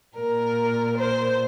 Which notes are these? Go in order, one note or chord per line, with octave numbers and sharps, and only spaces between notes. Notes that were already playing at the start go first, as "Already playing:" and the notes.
A#2 A#4
C5